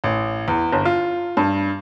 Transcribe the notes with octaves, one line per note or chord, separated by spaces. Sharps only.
A1
E2
G1
F4
G2